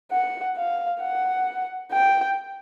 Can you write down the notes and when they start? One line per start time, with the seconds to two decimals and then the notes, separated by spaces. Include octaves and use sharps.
0.12 F#5
0.57 F5
1.02 F#5
1.93 G5